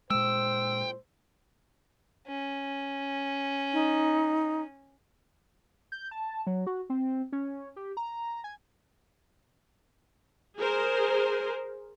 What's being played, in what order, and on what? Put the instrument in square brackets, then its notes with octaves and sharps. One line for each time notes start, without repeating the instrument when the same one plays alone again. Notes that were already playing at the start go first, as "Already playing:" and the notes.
[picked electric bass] A#2 G#3 [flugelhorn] C5 [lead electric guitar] G5 [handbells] E6
[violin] C#4
[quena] D#4
[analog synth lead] G6
A5
F#3
F#4
C4
C#4
G4
A#5
G#5
[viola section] G#4 A#4 C5